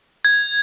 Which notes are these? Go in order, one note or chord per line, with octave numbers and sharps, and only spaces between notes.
G#6